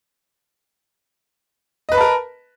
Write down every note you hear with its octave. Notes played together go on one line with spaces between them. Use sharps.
A#4 B4 D#5 A5 B5